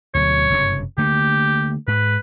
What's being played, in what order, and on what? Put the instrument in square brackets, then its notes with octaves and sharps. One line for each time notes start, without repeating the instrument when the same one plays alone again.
[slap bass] D2 B2 F#3 [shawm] C#5
[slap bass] F#1 G2 C3
[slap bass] D3 A3 A#3 [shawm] G4
[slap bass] G#2 [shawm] B4